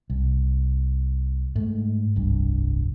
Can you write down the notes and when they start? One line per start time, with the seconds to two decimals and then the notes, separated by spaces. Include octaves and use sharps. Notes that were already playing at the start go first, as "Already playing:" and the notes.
0.10 C2
1.55 G#2 A3
2.16 F1 C2 G2